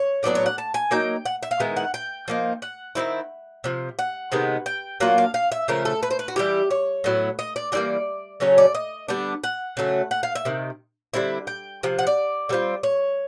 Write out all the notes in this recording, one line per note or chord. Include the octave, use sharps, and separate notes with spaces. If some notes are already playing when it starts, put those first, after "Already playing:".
Already playing: C#5
A2 F#3 B3 D4 D5
C#5
F#5
A5
G#5
F#3 A#3 D#4 G5
F#5
E5
F5
D#3 G#3 B3 E4
F#5
G5
F3 A#3 D#4
F#5
D#3 G3 C4 E4
C3 F3
F#5
C3 D#3 G#3 B3
G5
F#3 A#3 D4 F4 F#5
F5
F5
E5
C#3 F3 A3 A#4
A4
B4
C5
B4
F#4
E3 G3 B3 E4 G4
C#5
A2 F#3 B3 E4
D#5
D5
E3 G3 A#3 D5
C#3 F#3 A3 C#4 C#5
D5
D#5
D3 G3 B3 D4
F#5
C#3 F#3 A3
F#5
F5
E5
C3 D#3
D3 G3 C4 E4
G5
C3 F3
F#5
D5
D3 G3 C4 F4
C#5